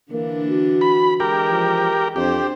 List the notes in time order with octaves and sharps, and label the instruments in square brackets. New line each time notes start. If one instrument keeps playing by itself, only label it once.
[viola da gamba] D3 E3 D4 [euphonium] A#3
[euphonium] F#4
[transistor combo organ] B5
[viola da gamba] E3 G#3 [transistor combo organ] G4 A#4
[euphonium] F3
[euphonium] F2 [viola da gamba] C4 D4 C5 [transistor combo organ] G4